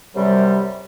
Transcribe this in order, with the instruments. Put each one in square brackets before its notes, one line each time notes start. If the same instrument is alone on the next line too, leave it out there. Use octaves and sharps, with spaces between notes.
[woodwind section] F#2 C3 G3